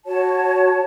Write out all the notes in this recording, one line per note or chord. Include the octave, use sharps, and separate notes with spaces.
F#4 C#5 A5